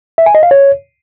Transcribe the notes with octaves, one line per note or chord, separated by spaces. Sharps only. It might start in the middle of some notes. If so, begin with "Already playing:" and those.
E5
G#5
D#5
F5
C#5